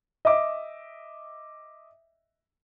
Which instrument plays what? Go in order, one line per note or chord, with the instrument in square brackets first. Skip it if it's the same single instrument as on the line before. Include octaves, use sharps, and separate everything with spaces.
[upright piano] D#5 E5 D6